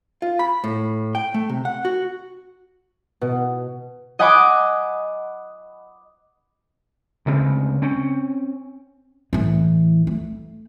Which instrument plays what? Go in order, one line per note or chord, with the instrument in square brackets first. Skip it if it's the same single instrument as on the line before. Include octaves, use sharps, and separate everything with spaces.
[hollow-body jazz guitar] F4
B5
A2
G5
A3
C3
F#5
F#4
[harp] B2
D#5 F#5 G#5 B5 C#6 D6
[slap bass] D2 C#3 G#3 C4
C4 C#4
[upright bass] A2 E3
A3